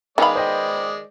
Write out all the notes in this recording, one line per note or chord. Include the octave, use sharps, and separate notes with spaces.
D#3 G#3 B3 G#4 D5 F5 B5
C5 D#5 G5